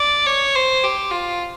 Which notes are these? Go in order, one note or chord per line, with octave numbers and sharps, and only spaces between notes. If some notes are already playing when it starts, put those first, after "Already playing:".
Already playing: D5
C#5
C5
G4
F4